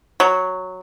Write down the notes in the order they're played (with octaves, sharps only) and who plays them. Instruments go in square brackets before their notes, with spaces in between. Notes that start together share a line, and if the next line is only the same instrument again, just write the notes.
[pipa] F#3